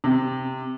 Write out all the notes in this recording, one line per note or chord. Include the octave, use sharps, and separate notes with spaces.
C3